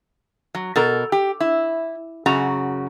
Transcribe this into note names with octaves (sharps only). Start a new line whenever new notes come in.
F#3
B2 A4 A#4
G4
E4
F#2 C#3 F#4 A#5